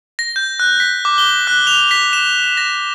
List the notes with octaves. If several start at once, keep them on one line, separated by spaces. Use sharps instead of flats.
A#6
G6
F#6
B6
D6
G7
F#6
F7
B6
E7
A#6